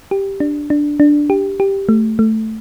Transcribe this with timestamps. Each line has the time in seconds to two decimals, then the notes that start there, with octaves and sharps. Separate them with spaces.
0.11 G4
0.40 D4
0.70 D4
1.00 D4
1.30 G4
1.60 G4
1.89 A3
2.19 A3